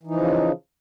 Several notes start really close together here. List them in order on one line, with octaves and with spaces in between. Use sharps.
E3 D#4 F3 C#3